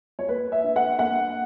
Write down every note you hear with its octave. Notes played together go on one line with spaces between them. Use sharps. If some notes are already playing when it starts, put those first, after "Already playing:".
C#5
A#3 B4
E5
D4
F#5
A#3 F#5